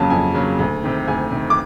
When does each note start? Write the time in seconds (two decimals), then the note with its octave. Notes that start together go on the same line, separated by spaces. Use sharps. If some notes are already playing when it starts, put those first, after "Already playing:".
Already playing: F2 C#3 F#3 A#3 A5
0.10 F2 G#5
0.35 C#3 F#3 A#3
0.59 D2
0.83 C3 D#3
1.08 D2 G#5
1.32 C3 D#3
1.50 D6